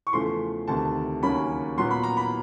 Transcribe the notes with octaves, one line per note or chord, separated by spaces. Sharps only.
C#6
E2 C#3 F3 A3 C6
D2 C3 D#3 A5
D#2 C#3 F#3 A#3 C#4 B5
A#2 F#3 B3 C6
B5
A#5
B5